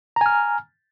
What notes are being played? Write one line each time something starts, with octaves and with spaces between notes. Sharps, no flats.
G#5 A#5 F6